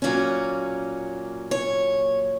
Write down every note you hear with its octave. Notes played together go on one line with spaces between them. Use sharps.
A#2 F#3 A#3 C#4
C#5